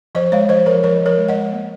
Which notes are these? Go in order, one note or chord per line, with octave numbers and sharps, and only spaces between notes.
F3 C5 D#5
G#3 C#5 F5
F3 C5 D#5
F3 A#4 C#5
F3 A#4 C#5
F3
A#4 C#5
G#3
D#5 F#5
G#3
A#3